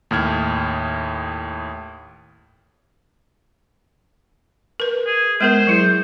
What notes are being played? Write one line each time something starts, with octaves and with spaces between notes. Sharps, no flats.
D#2 A2 F6 G#6
A#4 B4
G#4
G#3 B3 A#4 C5
F#3 E4 G#4